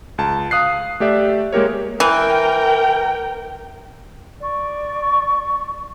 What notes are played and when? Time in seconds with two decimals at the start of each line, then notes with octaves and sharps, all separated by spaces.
0.18 C#2 A5
0.51 F5 D#6 F#6 C7
1.00 A3 G4 D5 E5
1.53 G#3 A#3 G4 A#4 C#5
2.00 E3 A#4 G5
4.41 D5 C#6